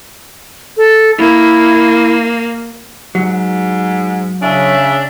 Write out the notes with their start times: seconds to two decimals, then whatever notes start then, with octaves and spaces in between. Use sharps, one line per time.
0.77 A4
1.18 A#3 E4
3.15 G#2 F#3
4.42 C#3 D4 E5